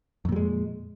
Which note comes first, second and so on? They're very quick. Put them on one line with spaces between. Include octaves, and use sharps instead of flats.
F2 A#2 G3 G#3